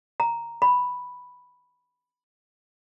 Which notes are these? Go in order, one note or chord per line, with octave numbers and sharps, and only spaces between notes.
A#5
B5